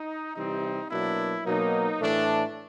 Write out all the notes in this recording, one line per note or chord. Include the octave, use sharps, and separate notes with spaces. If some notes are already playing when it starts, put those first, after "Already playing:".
Already playing: D#4
C3 E3 G3 C4 D#4
B2 F#3 A#3 D4 E4
B2 F#3 A#3 D#4
A2 E3 A3 D4